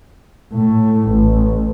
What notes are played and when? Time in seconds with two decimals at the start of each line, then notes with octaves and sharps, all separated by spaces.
0.53 A2
1.09 A1